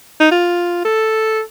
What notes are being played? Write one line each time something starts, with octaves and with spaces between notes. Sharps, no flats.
D#4
F4
A4